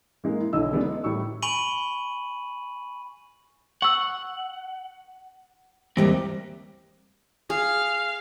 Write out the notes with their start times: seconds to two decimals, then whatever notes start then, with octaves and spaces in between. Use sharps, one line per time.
0.24 G#3 A#3
0.40 E4
0.53 B1 D3 E4 D#5 E6
0.72 D3 G#3 B3 C#4 F#4 D5
0.85 D#4
1.04 A2 G3 C#6 E6
1.42 G#5 B5 C#6 D#7 F#7
3.82 F#5 C#6 E6
5.97 D#2 E3 G3 A#3 C4
7.50 G#4 F5